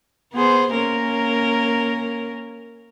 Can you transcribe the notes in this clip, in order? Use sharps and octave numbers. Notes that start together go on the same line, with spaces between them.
B3 G#4 C5
A#3 C#4 A#4